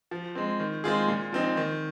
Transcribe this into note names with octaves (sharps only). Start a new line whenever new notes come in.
F3
G#3 C4
D#3
G#3 C4 F4 G#4
A#2
F3 C4 D#4
D#3